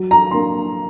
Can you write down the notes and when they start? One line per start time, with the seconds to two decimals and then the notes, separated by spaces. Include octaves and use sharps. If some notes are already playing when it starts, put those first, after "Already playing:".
Already playing: F#3
0.11 A#5
0.31 A#3 D4 C6